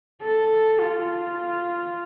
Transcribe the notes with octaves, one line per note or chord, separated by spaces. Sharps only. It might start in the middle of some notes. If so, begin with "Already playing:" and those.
A4
F4